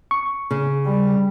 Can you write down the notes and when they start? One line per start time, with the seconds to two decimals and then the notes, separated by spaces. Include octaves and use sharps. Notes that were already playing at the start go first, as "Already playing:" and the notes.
0.11 C#6
0.51 C#3
0.85 G3